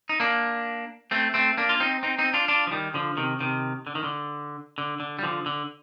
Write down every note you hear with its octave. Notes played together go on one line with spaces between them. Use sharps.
D#4
A#3 D4
A3 C4
A3 C4
A#3 D4
F4
C4 D#4
C4 D#4
C4 D#4
D4 F4
D4 F4
F3
D#3 G3
D3 F3
C3 D#3
C3 D#3
D3
D#3
D3
D3
D3
G3
D3 F3
D3